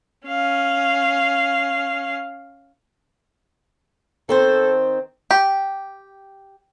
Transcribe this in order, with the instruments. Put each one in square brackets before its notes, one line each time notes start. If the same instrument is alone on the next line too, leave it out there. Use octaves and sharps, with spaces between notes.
[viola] C#4 F5
[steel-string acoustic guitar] D#3 C4 C5 [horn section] A4
[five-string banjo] G4